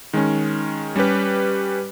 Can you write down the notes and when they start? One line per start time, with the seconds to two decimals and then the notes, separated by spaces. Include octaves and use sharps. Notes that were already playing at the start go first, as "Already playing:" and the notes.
0.13 D#3 G#3 C#4
0.96 G3 C#4 G4 B4